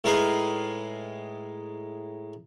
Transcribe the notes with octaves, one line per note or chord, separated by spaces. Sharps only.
A2 G#3 D#4 G#4 B4 F5